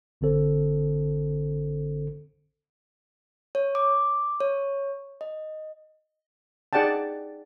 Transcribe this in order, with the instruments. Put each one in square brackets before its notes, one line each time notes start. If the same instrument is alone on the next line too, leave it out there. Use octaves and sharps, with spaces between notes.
[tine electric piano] A1 D3 C4 A4 C5
[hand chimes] C#5
D6
C#5
D#5
[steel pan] D#4 G#4 D5 F#5 G5 A5